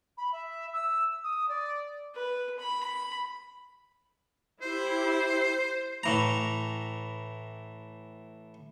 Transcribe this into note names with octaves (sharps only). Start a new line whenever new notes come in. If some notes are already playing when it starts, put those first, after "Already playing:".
B5
E5
E6
D#6
D5
B4
B5
E4 G4 C5
A2 E3 A#5